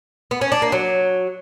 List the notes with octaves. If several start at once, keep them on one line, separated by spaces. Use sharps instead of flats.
B3
C#4
D4
A#3
F#3